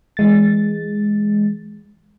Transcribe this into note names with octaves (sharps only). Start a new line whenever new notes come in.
E3 G#3 A6